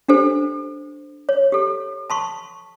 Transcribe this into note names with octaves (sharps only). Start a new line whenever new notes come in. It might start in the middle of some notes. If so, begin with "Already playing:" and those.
D4 G4 A4 C5
C#5
G4 A4
A5 C6 C#6